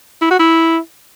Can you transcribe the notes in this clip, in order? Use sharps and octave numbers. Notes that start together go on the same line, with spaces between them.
E4
F#4
E4